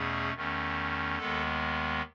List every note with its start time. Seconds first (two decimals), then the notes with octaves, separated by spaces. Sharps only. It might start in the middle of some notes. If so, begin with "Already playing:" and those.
Already playing: E2 B2 A3 C#4 G#4
0.34 E2 D#3 A3 C#4
1.18 D#2 D#3 G#3 B3 A4